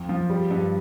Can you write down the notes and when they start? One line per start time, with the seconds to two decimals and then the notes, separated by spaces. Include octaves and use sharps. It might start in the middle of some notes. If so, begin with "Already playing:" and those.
Already playing: F2
0.09 F3
0.30 G3
0.51 G2